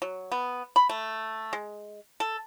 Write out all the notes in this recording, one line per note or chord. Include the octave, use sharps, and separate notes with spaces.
F#3
B3
B5
A3
G#3
A4